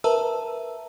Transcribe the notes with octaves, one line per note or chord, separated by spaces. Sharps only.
A#4 B4 E5 A5 A#5 E6